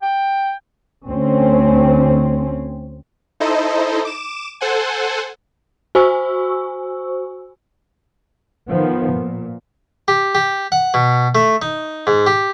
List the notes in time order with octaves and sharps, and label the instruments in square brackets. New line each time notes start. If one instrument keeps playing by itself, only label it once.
[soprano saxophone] G5
[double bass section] D2 C4 C#4
[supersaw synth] D#4 E4 A4 C5 D#5
D6 E7
A4 C5 F#5 G#5
[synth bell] F#4 C5 G#5 C#6 E6
[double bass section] D#3 F3 B3
A#2
[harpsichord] G4
G4
F#5
B2
A3
D#4
G#2
G4